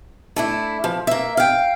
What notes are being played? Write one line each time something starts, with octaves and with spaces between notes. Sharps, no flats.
A3 D4 E4
F3
A#3 E5
F5 G5